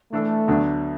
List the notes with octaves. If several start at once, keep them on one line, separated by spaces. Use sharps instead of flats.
E3 A3 D4 A4
D2 D3 F#3 B3 D4